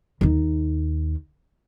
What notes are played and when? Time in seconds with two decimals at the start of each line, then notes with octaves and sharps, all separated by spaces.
0.21 D#2 D#4